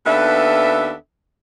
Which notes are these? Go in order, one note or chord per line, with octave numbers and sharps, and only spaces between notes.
D#2 B3 D4 A4 B4 E5